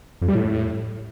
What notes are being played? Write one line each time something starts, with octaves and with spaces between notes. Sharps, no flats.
F2
G3
A2